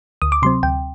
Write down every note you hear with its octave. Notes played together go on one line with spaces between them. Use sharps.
D2 D#6
D6
C3 F#3 C4 C6
D2 G5